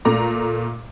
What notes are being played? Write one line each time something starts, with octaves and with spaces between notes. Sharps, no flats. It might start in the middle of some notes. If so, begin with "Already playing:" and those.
A#2 A3 A#5 D6